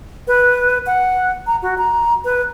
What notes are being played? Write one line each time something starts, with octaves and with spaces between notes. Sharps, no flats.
B4
F#5
A#5
F#4
A#5
B4